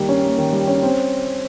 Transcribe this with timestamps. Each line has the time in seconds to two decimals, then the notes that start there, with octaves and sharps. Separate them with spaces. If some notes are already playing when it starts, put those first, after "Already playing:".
Already playing: D#3 G3 A#3
0.09 C#4
0.24 A#3
0.38 D#3
0.53 G3
0.68 C#4
0.82 C4